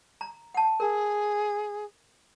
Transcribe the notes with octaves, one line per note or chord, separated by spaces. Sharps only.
A#5
F#5 A5
G#4 A#4